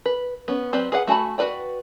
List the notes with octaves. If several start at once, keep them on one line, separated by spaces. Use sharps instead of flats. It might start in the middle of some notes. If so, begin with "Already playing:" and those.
B4
B3 C#4
F#3 C4 G4 B4 D5
G#4 B4 F5 F#5
A3 F#4 G#5 A5 B5
F#4 A4 B4 D5 G5